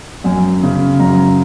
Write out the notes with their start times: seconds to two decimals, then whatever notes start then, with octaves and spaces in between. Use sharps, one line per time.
0.24 F#2 G#5
0.63 C#3
0.99 F#2 A#5